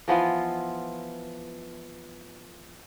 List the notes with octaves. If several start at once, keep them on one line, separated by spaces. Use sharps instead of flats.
E3 F3 B3 F4